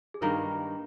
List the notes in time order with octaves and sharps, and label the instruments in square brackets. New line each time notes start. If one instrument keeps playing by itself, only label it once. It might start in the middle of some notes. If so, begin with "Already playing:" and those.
[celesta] G#4
[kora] G2 D#3 G3 A#3 [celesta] A#4